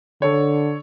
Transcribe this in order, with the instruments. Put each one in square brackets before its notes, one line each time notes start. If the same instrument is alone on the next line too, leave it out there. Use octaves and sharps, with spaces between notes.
[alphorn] D3 [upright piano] A4 C#5